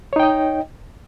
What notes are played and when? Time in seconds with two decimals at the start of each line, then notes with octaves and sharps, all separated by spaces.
0.13 C#5
0.16 D#4
0.20 G5
0.23 D#5